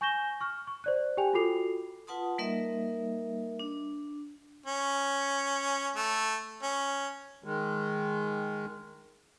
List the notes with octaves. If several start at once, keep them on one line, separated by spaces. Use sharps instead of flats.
G#5 C#6 G6 A#6 E7 G7
C#6 F6
C#6
C5 D5 F#6
G4 G5 G#5 F7
F4 F#4 A4 D6 C7 F7
F4 B4 F#5 A5 C6 D#6
G3 A#3 D#4 A#4 D#5 E5
D4
C#4
A3
C#4
D#3 G#3